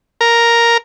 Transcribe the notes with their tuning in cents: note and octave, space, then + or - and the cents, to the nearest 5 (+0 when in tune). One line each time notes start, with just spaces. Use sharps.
A#4 +0